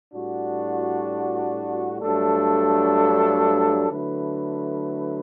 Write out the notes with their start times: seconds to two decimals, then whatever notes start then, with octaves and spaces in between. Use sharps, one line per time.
0.13 A2 G3 D4 F#4
2.01 G2 F#3 A3 D4 A4
3.90 D3 F#3 A3 E4 B4